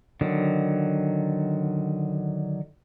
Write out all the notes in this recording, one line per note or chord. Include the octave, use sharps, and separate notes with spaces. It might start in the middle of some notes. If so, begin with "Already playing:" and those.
D3 D#3 F#3